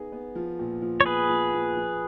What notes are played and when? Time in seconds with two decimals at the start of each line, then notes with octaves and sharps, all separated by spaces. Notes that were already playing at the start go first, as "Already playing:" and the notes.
Already playing: B3 D#4 G#4
0.12 B3
0.35 F3
0.59 A#2
0.82 F3
1.01 C#5
1.06 B3 G#4 B4
1.29 F3
1.54 F3
1.76 F3